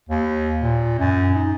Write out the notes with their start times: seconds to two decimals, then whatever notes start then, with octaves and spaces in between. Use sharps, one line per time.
0.09 D#2
0.62 A#2
0.99 F#2
1.35 D#4